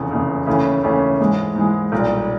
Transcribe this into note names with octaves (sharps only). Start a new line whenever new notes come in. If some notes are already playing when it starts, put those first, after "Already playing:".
Already playing: F1 E2 C#3
F1 E2 C#3
D#2 C#3 E3 A3 C#4
D#2 C#3 E3 A3 C#4
G#2 E3 G#3
G#2 E3 G#3
B1 A#2 G3